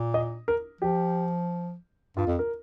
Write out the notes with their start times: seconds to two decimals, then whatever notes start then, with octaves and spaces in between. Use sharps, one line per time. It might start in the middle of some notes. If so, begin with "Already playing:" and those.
Already playing: A#2
0.14 D#5
0.48 A#4
0.81 F3 G4
2.17 G2 F4
2.27 F2
2.39 A#4